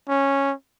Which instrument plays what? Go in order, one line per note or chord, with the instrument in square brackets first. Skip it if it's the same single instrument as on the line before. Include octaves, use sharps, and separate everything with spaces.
[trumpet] C#4